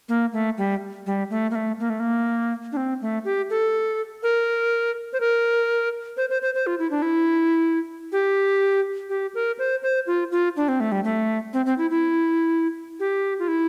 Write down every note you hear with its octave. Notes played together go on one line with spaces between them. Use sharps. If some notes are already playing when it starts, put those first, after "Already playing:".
A#3
A3
G3
G3
A3
A#3
A3
A#3
A3
A#3
D4
C4
A3
G4
A4
A#4
C5
A#4
C5
C5
C5
C5
F4
E4
D4
E4
G4
G4
A#4
C5
C5
F4
F4
D4
C4
A3
G3
A3
C4
C4
E4
E4
G4
F4
E4